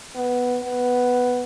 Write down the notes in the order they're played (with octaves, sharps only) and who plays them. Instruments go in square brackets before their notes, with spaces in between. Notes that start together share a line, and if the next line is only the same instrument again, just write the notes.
[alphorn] B3
B3